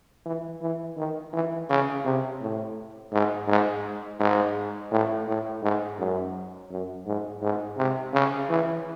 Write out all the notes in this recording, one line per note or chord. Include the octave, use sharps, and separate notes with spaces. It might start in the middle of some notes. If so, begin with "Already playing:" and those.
E3
E3
D#3
E3
C#3
C3
A2
G#2
G#2
G#2
A2
A2
G#2
F#2
F#2
G#2
G#2
C3
C#3
E3